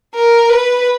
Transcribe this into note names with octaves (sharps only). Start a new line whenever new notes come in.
A#4
B4